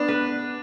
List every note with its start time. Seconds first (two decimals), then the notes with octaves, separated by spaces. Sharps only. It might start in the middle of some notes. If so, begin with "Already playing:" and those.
Already playing: B3 D4
0.08 B4